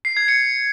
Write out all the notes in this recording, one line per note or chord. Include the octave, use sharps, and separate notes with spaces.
C7
G#6
C#7